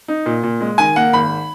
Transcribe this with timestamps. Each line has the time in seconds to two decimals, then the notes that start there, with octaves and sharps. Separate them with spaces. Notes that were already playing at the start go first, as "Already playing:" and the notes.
0.08 D#4
0.26 A#2
0.43 A#2
0.60 G#3
0.78 D#3 G#5
0.96 A#3 F#5
1.13 G#1 B5